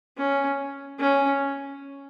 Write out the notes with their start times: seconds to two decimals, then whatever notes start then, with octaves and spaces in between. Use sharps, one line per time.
0.18 C#4
0.99 C#4